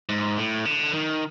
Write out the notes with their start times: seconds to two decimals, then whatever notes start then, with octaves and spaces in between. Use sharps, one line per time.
0.09 G#2
0.37 A2
0.66 D3
0.94 D#3